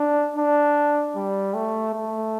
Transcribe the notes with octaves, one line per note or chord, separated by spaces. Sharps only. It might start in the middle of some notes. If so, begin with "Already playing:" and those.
Already playing: D4
D4
G3
A3
A3